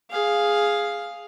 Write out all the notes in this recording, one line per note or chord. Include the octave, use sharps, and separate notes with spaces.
G#4 F5